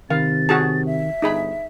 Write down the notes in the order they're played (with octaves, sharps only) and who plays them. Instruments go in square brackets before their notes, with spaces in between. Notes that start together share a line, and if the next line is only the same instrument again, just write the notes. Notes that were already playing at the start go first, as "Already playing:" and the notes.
[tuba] C3 [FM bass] D#3 [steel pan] F5 [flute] A6
[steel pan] F#4 G#4 A5
[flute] E5
[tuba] G1 [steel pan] D#4 G#4 B5